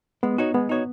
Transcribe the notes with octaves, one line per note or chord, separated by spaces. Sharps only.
G#3 B3
D#4 F#4 C#5
G#3 B3
D#4 F#4 C#5